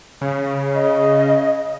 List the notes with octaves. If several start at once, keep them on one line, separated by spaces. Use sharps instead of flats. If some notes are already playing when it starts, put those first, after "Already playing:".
C#3
D#5